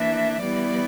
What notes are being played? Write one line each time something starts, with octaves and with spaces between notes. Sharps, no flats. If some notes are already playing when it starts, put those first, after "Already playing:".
Already playing: E3 A#3 D4 E5
E3 G3 B3 E4 D5